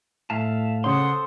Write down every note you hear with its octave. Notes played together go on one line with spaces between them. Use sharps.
A2 E5 F5 A5
C#3 C#4 A4 C5 C#5 F#5 C6 D#6